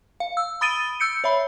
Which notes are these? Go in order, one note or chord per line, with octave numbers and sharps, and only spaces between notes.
F5
E6
B5 D#6 A6 D7 D#7 G7
E6 G6 C#7 D7
C#5 E5 B5